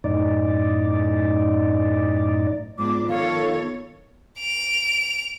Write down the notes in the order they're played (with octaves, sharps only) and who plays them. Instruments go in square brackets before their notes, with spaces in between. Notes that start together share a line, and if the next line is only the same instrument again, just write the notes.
[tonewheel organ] F#2 A2 D#4 D5
[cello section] G#2 D4 [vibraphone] B3 F4 [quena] D6
[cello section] D#3 A4 C#5 [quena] F5
[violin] D7 F7